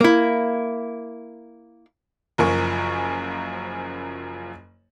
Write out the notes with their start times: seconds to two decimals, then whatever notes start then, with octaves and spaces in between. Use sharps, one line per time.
0.01 A#3 E4
2.38 F#1 F#2 F3 A#4 G#5 C#6